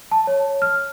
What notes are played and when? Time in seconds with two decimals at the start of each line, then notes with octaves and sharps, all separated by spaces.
0.11 A5
0.27 C#5
0.62 F6